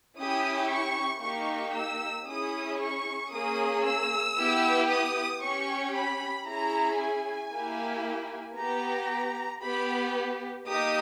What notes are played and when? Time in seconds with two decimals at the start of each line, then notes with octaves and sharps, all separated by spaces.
0.19 C#4 E4 G4 D#6
0.71 C#6
1.23 A#3 D#4 G4 C#6
1.76 E6
2.28 C#4 E4 G#4 D#6
2.81 C#6
3.33 A#3 C#4 G#4 D#6
3.86 E6
4.38 B3 E4 G4
4.91 D#6
5.43 C#4 G4 C#6
5.96 B5
6.48 C#4 E4 G#4 A#5
7.00 G#5
7.53 A#3 E4 G4
8.58 B3 G4 A#5
9.63 B3 G4 B5
10.69 A#3 D#4 G4 D#6